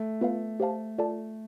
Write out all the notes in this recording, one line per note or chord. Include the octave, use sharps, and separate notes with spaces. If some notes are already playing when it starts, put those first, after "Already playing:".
Already playing: A3
B3 F4 B4 F5
G4 C5 F5 A5
F4 A4 D5 A5